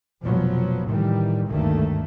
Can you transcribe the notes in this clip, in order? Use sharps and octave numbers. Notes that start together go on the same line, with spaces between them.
F1 B2 F3 F#3 B3
A2 D#3 E3 G3
G#1 D2 G2 D#3 A3 A#3